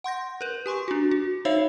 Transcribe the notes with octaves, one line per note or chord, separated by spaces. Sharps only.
F#5 C6 G6 A#6
A#4 B4
G4 G#5 C6 C#6
D4 F#4
F#4
D#4 C5 C#5 E5 F5 E6